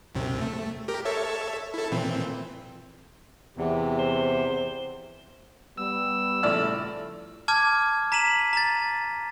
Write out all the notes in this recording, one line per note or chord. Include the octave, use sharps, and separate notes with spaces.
C2 F#2 C3
A3
G4 A#4
A4 C#5 E5
E4 A4
A#2 E3 C4
E2 C3
C5
G3 B3 E6
A#1 C#3 A3 E4 D5 F6
A5 D6 F6 G#6
A#5 B6 D#7 E7 F#7
A#5 A6